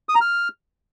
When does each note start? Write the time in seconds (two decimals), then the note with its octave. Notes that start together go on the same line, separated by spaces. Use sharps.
0.09 D#6
0.15 A#5
0.21 F6